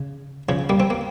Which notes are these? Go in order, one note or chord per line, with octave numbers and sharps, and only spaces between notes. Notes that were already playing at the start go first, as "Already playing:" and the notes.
Already playing: C#3
C#3 F3
G3 A#3
C4
A#3